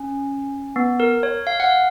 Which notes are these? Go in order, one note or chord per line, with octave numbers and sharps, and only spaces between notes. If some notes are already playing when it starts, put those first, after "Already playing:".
Already playing: C#4
B3
A#4
C#5
F5
F#5
F5